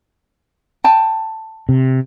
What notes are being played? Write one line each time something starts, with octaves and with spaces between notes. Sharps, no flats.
G5 A5
C3